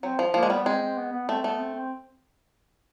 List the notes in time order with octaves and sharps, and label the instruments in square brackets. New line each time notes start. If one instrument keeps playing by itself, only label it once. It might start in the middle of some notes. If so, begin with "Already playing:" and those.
[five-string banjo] F#3 [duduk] C4
[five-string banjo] F3
[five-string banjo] F3 [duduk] A#3
[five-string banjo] G#3
[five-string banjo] G3 [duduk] B3
[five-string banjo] G#3 [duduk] C4
[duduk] C4
B3
B3
[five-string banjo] A3 [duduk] C4
[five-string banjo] A3 [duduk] B3
[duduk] C4
C4